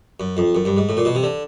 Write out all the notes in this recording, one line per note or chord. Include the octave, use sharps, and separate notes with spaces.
F#2
F2
F#2
G2
G#2
A2
A#2
B2
C3
D3